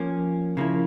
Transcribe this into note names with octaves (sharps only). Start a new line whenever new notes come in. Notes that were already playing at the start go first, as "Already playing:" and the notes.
Already playing: F3 A#3 C#4
C#3 F3 A#3 E4